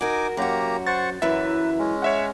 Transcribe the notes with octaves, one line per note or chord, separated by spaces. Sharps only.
D#4 F#4 A#4 G#5 D6
F#2 A#3 F#4 G4 A#5
C5 F#5 C#6 A6
F#2 E3 F#3 B4 E5
G#3 C#4
C#5 E5 F#5